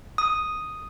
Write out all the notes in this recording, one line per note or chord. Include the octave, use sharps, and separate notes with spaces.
D#6